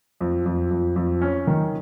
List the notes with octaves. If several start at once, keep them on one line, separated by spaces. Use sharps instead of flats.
F2
F2
F2
F2
C#4
D#3